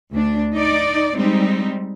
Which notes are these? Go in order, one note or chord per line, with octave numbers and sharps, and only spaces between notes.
D2 D4
D#4 D5
G3 G#3 C4 D#4